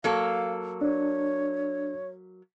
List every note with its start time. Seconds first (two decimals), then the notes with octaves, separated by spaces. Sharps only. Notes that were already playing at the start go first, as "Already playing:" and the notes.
0.04 F#3 A#3 A4 F5
0.81 D4 C#5